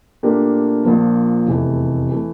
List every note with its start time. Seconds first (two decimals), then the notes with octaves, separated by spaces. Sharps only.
0.23 A#2 A3 D4 G4 A#4
0.84 A#1 A#2 F3 A#3
1.46 F1 E2 C3 E3 A3
2.11 E3 A3